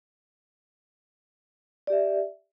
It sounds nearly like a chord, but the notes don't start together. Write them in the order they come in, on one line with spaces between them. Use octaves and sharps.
D5 G4 E5